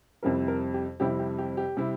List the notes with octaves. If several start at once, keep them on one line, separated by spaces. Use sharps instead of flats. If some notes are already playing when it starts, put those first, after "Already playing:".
F2 C3 G3 C4 E4 A#4
A#4
G4
F2 C3 G3 C4 E4 G4
G4
G4
G4
C3 G3 C4 E4